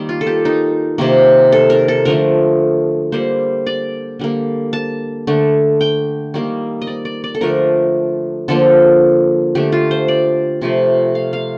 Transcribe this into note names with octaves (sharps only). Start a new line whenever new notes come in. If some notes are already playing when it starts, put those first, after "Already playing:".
Already playing: D#3 G3 A#3
F4
A4
G4
D#4
C3 D#3 A#3
A4
A#4
A4
D3 F3 A3 A#4
D3 G3 A#3 C5
D5
D3 G3 A#3
A5
D3 A3
G5
D#3 G3 A#3
D#5
D5
D5
D5
A4
D3 F3 A3 A#4
D3 F3 A#3 A4
D3 A3 G4
F4
C5
D5
C3 F3 A3
F5
F5